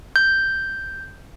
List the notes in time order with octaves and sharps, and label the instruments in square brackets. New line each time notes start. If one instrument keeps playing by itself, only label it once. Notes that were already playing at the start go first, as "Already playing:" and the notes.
[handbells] G6